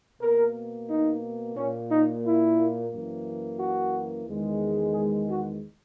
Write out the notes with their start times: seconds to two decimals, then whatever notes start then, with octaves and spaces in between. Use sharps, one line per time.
0.21 B2 A#3 A#4
0.89 D#4
1.56 A#2 A#3 C#4
1.91 D#4
2.25 E4
2.91 F#2 E3 A#3
3.59 F#4
4.27 E2 D#3 G#3
4.93 G#4
5.27 F#4